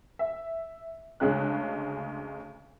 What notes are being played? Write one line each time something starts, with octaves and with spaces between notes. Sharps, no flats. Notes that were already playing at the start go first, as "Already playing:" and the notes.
E5
D2 C#3 G#3 C#4 F#6